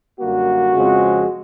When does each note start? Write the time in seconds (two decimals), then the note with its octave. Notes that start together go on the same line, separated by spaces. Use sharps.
0.19 F#2 D3 G3 A#3 F#4
0.73 F2 C#3 F3 G#3 C4